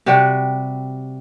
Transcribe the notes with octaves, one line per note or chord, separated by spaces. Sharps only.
C3 G3 F#4